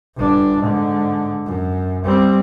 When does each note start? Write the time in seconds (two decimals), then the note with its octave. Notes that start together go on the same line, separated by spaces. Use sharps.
0.16 G1 D4
0.59 G#2 D3
1.45 F#2
2.04 G3 C4